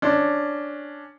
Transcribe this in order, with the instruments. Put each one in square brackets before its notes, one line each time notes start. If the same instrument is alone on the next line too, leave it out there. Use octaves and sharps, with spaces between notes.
[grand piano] C#4 D4